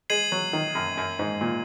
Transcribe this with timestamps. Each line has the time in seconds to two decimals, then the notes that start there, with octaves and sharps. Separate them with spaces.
0.10 G#3 G#6 C7 D#7 F#7
0.32 F#3
0.53 D#3
0.75 F#2
0.98 F#2
1.19 G#2
1.41 A#2